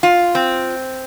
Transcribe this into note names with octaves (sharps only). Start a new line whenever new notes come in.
F4
C4